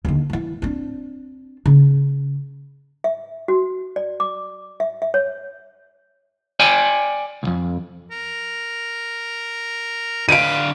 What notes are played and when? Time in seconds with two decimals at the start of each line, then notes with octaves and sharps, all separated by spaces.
0.05 D#2 D3
0.30 E3 G3
0.62 C4 D4
1.66 C#3
3.04 E5
3.48 F#4
3.96 D5
4.20 D6
4.80 E5
5.02 E5
5.14 C#5
6.60 D5 G5 G#5
7.43 C2 F2
8.11 A#4
10.29 D3 B4 F5 D7 D#7